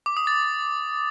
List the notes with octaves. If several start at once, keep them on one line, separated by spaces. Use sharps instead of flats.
D6
D#6
A6